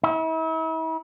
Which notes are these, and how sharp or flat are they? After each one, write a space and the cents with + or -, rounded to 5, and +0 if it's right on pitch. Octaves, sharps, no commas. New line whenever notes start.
E4 -40